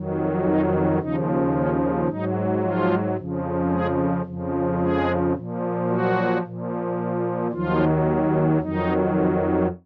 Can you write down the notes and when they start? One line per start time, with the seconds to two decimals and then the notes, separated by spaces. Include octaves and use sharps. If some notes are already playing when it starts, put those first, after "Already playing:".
Already playing: F2 D#3 F#3
0.45 D#4
0.99 D#2 C#3 F3 D#4
1.54 C#4
2.08 G#2 F#3 D#4
2.62 F3 F4
3.16 F2 C#3 F3
3.71 G#3 G#4
4.26 F2 C#3 F3
4.79 G#3 G#4
5.34 A#2 F3
5.89 F#3 F#4
6.43 A#2 F3
7.51 D#2 D#3 F3 F#3 F4
8.60 F2 D#3 F#3 D#4